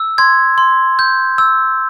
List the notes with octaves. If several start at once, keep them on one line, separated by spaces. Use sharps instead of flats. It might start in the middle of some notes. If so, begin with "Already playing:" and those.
Already playing: E6
C6 G#6
C6
G6
E6